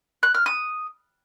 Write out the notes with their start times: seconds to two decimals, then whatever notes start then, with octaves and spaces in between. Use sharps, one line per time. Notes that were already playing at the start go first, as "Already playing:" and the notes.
0.23 F#6
0.34 F6
0.46 D#6